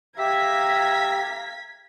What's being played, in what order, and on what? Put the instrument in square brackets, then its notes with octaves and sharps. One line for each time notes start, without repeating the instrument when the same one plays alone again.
[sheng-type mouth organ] G4 [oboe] E5 [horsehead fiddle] F5 A#5 [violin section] G#6 B6